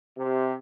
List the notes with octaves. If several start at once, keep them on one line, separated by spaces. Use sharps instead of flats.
C3